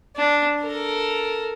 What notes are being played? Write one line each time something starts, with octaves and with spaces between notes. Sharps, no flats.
D4
A4 A#4